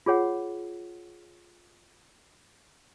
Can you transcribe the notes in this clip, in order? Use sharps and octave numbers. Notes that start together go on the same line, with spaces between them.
F4 G#4 C#5 F#5